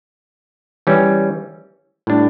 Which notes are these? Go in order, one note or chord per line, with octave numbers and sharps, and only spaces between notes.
E3 G3 C#4
A2 G3 D4